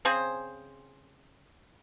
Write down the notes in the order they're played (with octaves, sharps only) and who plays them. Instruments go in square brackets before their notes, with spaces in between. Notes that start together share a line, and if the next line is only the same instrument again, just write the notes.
[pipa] C#3 C4 G#4 C5